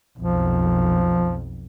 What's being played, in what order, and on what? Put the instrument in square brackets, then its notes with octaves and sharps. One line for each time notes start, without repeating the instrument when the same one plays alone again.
[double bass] B1 F2 [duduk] F3